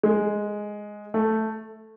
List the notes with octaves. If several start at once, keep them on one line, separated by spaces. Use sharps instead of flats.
G#3
A3